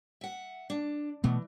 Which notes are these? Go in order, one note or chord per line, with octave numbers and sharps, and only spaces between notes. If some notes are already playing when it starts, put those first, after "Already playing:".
E5 F#5
D4
B2 E3 A3 B3